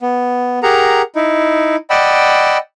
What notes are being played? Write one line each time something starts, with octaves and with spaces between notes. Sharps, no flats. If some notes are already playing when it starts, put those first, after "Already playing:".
B3
G4 G#4 A#4 F#5 A#5
D#4 E4
D5 D#5 F#5 G5 B5 E6